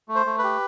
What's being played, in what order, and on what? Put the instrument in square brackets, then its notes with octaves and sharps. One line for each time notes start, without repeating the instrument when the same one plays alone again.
[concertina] A3
C5
A3
B4
G4